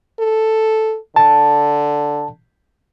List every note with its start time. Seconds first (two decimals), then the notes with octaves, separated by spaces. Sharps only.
0.19 A4
1.16 D3 A5